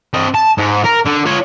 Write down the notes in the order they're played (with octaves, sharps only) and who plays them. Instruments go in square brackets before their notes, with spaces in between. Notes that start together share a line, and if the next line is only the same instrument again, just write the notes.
[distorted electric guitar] C4 D#5
A5
G#2
A#4
D3
F4 C#5